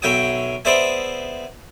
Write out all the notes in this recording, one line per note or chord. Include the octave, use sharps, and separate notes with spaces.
B1 F#3 E5 G5 G#5 D#6
B3 G#4 C5 D5 E5 G#5